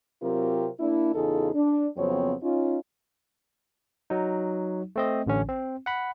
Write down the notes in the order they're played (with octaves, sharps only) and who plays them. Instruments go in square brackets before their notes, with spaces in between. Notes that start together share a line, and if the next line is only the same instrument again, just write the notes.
[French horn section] C3 F#3 C4 F4 G4 A#4
A#3 D4 E4
E2 C#3 D#4 F4 G#4 A4
D4
F2 C#3 F#3 B3 C4 C#5
C#4 D#4 F4
[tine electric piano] F#3 D#4
A3 C4 D#5
A1 D3 C#4
C4
F#5 B5